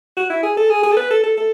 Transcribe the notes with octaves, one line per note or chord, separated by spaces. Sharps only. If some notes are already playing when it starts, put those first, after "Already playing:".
F#4
E4
G#4
A4
G#4
G#4
A4
B4
A4
A4
A4